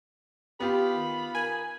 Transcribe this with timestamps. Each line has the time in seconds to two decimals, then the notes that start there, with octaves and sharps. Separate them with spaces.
0.60 B3 F4 G4 B5
0.95 D#3
1.35 A#4 G#5